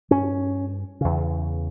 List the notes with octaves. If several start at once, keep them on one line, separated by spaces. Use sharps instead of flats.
G2 C#4
E2 C#3